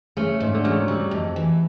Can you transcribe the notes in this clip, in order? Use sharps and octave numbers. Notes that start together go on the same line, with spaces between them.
C#3 A3
G#2
D3
C#3 F#3
C3 G3
F2
E3